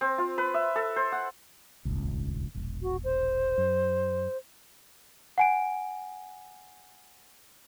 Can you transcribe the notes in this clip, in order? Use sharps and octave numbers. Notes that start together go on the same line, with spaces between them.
C4
F4
B4
E5
A4
C5
F#5
D#1 G#1 C#2
E1 A#1
F#4
C5
F#2
F#5 G#5 D7